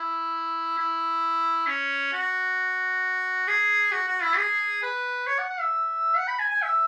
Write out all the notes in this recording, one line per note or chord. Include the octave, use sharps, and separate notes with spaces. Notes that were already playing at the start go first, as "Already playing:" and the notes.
Already playing: E4
E4
C#4
F#4
G#4
F#4
F#4
E4
G#4
B4
C#5
F#5
F#5
E5
F#5
B5
G#5
G#5
E5